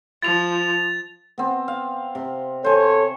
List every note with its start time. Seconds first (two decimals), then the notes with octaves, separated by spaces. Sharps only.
0.22 F3 A6 F7
1.38 B3 C4
1.68 F5
2.15 C3
2.64 A4 C5 C#5 G#5